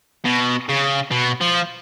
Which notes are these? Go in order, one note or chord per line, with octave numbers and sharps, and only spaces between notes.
B2
C#3
B2
F3